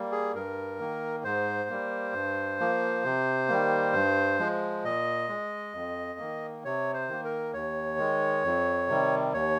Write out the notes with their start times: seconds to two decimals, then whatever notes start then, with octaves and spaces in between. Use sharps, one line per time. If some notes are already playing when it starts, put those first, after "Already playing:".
Already playing: G3 A#3
0.12 G#4
0.35 G2 A#4
0.79 D#3 A#3
1.24 G#2 C5
1.69 G3 A#3
2.14 G2
2.60 F3 A#3
3.04 C3
3.49 D#3 G3 A#3
3.94 G2
4.39 F3 G#3
4.84 A#2 D#5
5.29 G#3
5.74 F2
6.19 D#3 A#3
6.64 C3 C#5
6.94 C5
7.08 D#3 A#3
7.25 A#4
7.54 D#2 C#5
7.98 D#3 G#3
8.44 F2
8.88 C3 D#3 G3
9.33 D#2 C#5